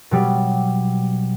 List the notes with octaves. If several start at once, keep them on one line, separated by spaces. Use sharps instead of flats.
B2 F#3 G3